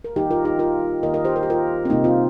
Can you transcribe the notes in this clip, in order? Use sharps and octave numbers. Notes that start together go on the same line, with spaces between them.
A#4
D#3 G3 A#3 D#4 G4
F4 A#4
D#4 G4
F4 A#4
D#3 A#3 A#4 D#5
A#4 D#5
G4 C5
A#4
G4
F4 A#4
C4
C3 G3 A#3 D#4
C4 F4